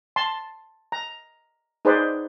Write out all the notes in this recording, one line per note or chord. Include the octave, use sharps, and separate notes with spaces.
A5 C6
A#5
D#4 G#4 B4 C5 D5